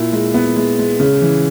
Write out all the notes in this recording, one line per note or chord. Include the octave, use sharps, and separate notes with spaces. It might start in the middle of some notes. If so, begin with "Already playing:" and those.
Already playing: A#2 E4
G#3
B3
G#3
G#3
C#3
E3